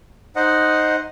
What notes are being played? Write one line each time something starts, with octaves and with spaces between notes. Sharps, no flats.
D#4 C5 D#5 F#5